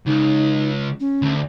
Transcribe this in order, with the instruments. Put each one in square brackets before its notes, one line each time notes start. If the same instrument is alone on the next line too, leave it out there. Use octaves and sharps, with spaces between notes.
[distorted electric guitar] C#2 [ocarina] D#4
[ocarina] C#4
[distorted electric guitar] D2